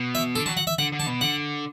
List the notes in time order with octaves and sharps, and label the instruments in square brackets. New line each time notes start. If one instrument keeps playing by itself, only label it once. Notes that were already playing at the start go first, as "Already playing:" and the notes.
Already playing: [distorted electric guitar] B2
[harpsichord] E5
[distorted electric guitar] D3 [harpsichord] A4
[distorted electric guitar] F#3 [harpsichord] A5
[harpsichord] F#5
E5
[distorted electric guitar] D3 [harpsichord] F#5
[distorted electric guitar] D3
[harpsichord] A5
[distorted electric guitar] B2
[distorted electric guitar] D3 [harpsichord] F#5